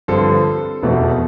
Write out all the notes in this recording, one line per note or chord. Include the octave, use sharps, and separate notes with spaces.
G2 D3 F3 C4 A4 C5
F1 E2 B2 A3